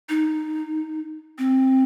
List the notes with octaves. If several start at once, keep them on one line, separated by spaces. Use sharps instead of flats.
D#4
C4